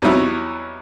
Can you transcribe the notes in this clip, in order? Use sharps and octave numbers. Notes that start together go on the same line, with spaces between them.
E2 F#3 G3 D#4 E4 C#5